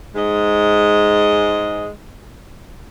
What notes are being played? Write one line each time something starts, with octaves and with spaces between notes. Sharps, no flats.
G#2 G#3 D#5